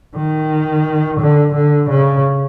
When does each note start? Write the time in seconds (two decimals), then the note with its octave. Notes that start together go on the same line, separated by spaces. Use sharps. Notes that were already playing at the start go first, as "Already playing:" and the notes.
0.16 D#3
1.21 D3
1.55 D3
1.90 C#3